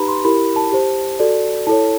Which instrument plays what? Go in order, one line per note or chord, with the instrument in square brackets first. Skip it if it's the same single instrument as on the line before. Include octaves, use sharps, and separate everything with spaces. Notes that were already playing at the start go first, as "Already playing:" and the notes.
Already playing: [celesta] D#4 G4 B4 A#5 B5
C6
E4 G4 A#4 B5
A5
G4 C5
F#4 A4 D5
E4 A4 C#5 A5